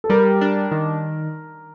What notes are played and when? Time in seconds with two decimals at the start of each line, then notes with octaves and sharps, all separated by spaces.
0.04 A4
0.10 G3 A#4
0.41 D4
0.71 D#3